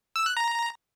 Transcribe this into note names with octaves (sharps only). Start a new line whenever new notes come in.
E6
F#6
A#5